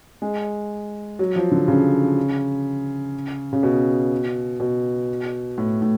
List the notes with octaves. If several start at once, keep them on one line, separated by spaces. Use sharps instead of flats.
G#3
F#3
F3
D3
C#3
C#3
B2
B2
A2
A2